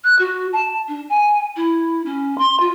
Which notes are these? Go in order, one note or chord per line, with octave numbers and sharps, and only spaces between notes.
F#6
F#4
A5
D4
G#5
E4
C#4
C6
F4